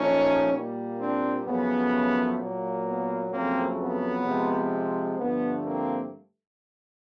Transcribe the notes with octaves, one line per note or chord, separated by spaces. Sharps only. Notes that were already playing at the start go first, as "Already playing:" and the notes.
Already playing: A#2 F3 A3 C#4 D#4
A#2 G3 A#3
C4 D4
F#2 C#3 F3 A3 B3
A#2 F#3 A#3
B3
F2 C#3 F#3 A3 A#3 C4
B3
C3 F3 G#3
G2 D3 F3 A3 B3
A#3 C4